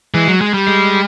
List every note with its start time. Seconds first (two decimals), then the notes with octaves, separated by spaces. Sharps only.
0.14 E3 G#3
0.28 F#3
0.41 G#3
0.54 G3
0.68 G#3